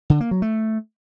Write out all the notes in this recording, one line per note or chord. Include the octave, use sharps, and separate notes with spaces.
D3
A#3
F#3
A3